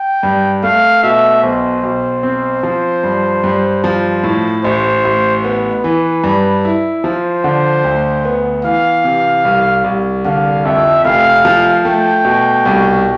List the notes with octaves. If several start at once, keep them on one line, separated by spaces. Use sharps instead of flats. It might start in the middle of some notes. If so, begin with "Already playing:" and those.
Already playing: G5
G2
A3 F5
B2 E5
B1 C5
B1
C4
F3
G2
G2
F3
A2
A1 C5
A1
B3 B4
E3
G2
E4
F3 C5
D3
D2
B3
E3 F5
C3
C2
C2
D3 F5
F2 E5
F1 F5
F3
A3 G5
B2
C2